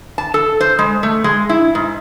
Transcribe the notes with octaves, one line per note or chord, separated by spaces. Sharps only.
A5
A4
C5
G#3
A3
G#3
E4
G#2